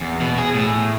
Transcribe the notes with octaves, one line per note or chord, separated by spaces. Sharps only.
E2
B2
G#4
A2